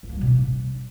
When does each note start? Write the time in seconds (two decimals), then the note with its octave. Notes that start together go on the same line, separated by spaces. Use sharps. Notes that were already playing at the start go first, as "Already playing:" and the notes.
0.03 E3
0.09 A#3
0.15 G3
0.21 B2
0.27 D4